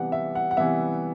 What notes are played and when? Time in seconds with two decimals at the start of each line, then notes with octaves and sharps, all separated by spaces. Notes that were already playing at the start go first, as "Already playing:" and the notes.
Already playing: C3 E3 G3 B3 F#5
0.12 E5
0.35 F#5
0.51 F#5
0.57 C3 E3 G3 B3 E5